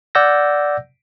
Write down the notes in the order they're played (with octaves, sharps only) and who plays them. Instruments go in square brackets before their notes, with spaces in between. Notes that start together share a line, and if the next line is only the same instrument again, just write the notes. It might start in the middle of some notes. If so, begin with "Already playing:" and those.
[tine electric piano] D5 F#5 E6 G6 A#6